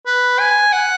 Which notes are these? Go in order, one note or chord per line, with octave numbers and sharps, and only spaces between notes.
B4
G#5
F#5